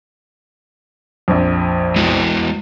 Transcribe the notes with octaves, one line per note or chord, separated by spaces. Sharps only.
A#1 F2
G#3 E4 F#4